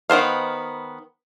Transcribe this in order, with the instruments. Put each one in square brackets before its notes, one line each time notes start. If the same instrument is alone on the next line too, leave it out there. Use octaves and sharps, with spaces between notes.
[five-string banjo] D#3 B3 C5 F5